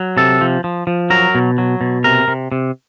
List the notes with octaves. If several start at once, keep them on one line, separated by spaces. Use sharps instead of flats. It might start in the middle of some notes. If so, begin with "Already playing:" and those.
Already playing: F#3
C3 A4
F3
F3
F3
F#3 A#4
B2
F#3
B2
C3 A#4
C3
C3